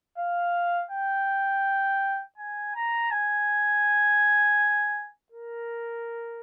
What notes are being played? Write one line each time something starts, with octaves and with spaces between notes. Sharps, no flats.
F5
G5
G#5
A#5
G#5
A#4